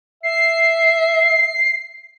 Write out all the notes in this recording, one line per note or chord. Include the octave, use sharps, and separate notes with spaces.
E5 C7